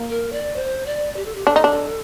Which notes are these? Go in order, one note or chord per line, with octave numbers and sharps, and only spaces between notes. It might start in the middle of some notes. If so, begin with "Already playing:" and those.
Already playing: A#3
A#4
D5
C5
D5
G4
A4
G4
D4 A4
D#4
D4